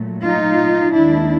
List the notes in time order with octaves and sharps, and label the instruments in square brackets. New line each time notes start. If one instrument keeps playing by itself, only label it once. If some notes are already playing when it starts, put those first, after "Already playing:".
Already playing: [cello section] A#2 F#3 A3
D#4 F4
D#2 D#3 G#3 D4 E4